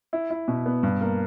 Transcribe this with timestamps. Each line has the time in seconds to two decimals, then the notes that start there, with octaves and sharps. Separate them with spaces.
0.13 E4
0.30 E4
0.48 B2
0.66 B3
0.83 G2
1.01 A#3